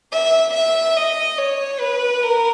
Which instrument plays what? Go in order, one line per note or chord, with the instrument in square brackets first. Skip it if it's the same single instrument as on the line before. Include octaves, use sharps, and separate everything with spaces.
[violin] E5
E5
D#5
C#5
B4
A#4